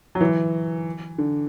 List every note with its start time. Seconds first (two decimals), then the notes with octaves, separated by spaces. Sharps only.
0.15 F#3
0.21 E3
1.18 D3